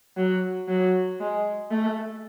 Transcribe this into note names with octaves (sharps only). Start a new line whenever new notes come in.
F#3
F#3
G#3
A3